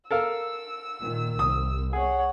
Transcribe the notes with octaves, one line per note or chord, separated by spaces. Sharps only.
A4 A#4 F5 E6
A#2 D#3
C2 D#6
G#4 C#5 F#5